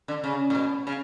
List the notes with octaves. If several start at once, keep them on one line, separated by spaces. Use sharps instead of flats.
D3
C#3
A2
B2
C#3